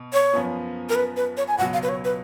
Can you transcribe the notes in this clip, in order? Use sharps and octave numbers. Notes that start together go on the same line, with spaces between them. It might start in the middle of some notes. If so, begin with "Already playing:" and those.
Already playing: B2
C#5
F#2 F3 B3
A#4
B4
B4
C#5
G#5
C#2 B2 F#3 F#5
F5
B4
C#5
B4